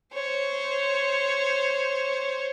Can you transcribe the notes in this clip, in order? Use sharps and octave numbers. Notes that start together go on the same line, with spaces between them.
C5 C#5